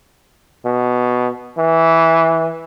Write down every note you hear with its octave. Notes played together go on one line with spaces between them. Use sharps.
B2
E3